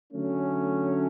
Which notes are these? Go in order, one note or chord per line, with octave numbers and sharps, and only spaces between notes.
D3 F#3 A3 C#4